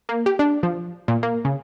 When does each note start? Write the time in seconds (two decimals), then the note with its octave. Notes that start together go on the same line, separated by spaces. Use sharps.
0.09 A#3
0.26 G4
0.39 D4
0.63 F3
1.08 A#2
1.23 A#3
1.45 C#3